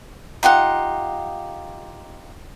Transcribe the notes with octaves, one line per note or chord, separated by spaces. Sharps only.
D#4 F4 G4 F#5